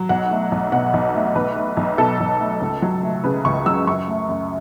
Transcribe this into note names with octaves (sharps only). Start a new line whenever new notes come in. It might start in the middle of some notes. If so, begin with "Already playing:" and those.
Already playing: F#3
B1 F#5
A3
B1
B2 F#5
B1
A3
B1 B4
A3
B1
B2 A4
B1
A3
C#2
F#3
A3
C#3 B4
C#2 C#6
F#3 E6
F#2 C#6
A3
F#2